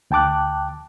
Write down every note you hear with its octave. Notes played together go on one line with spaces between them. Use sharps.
D2 G5 A5 D6 F#6